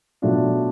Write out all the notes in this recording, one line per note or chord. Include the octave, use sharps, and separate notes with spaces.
B2 F#3 A3 D4 F4